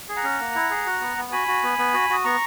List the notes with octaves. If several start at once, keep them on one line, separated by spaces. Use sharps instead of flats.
G#4
F#5 A#5
C#4
A#3
E4
G#4
F#4
B3
B3
F#4 G#5 B5
F#4
B3
B3
F#4
F#4 D#6
B3 A#5 C#6